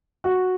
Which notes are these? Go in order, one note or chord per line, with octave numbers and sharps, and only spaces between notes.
F#4